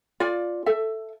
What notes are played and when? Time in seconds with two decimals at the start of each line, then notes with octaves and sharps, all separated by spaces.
0.20 F4 D5
0.66 A4 E5